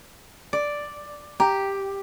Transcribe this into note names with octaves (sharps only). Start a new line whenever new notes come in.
D5
G4 A#5